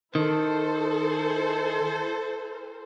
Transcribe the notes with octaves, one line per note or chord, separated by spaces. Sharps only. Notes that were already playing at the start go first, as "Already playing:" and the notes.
D#3 E4 A4 C5